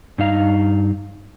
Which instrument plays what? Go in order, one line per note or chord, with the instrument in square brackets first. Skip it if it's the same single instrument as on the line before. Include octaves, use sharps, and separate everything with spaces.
[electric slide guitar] G2 D#4 F5 A#5